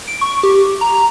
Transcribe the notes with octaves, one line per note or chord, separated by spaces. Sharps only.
D7
C#6
G4
A#5